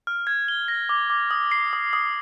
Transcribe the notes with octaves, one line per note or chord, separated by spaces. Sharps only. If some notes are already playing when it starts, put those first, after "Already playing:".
F6
G#6
G7
A#6
D6
D6
D#6
C7
D#6
D#6